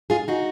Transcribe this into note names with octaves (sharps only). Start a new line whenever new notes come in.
F4 G#4
D#4 F#4